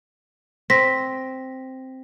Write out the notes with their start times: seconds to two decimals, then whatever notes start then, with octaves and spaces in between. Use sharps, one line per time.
0.70 C4 A#6 B6